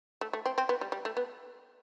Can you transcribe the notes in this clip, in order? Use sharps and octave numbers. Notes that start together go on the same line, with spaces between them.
A3
A3
C4
C4
B3
G3
G3
A3
B3